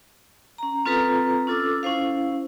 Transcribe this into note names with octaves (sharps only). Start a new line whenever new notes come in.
C#4 A#5
C4 F4 A4 B4 A#5 D#6
C#4 F4 A4 D6 E6
C#4 E4 C5 F5